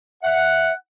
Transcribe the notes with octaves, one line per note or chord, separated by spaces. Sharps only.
E5 F#5